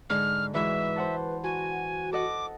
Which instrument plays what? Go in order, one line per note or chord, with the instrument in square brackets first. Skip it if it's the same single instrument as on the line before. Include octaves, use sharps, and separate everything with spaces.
[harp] G#2 D3 [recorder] F6
[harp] G#2 E3 F#4 [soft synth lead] B4 [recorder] E5
[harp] C5 F#5 A5
[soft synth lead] F#4 [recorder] G#5
[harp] A4 D#5 F#5 [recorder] D6